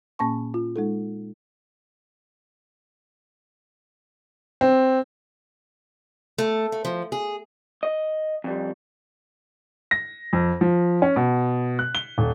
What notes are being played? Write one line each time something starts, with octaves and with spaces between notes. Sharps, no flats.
A#2 A#3 C#4 A5 C#6
F4
G#3 D#4 A4
C4
A3
A3
F3
G#4
D#5
F2 G3
A#6
F2
F3
C#4
B2
F#6
G7
D#1